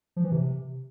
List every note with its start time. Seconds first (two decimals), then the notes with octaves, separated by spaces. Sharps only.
0.16 F3
0.24 E3
0.32 C3